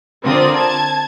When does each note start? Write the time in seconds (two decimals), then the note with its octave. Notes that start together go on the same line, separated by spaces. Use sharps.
0.25 D3 C4 F4 A#4 D5 D#6
0.54 A5 G#6